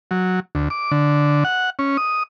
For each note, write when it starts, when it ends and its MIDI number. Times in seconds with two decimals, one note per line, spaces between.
0.11 0.40 54
0.55 0.68 38
0.70 0.91 86
0.91 1.44 50
1.45 1.70 78
1.79 1.97 61
1.97 2.23 87